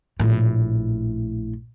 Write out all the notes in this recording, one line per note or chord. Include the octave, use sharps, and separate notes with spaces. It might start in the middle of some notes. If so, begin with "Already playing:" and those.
A#1 A2